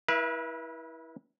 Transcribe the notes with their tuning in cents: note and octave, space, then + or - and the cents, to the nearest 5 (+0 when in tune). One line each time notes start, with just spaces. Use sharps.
E4 -15 B4 -35 E5 +35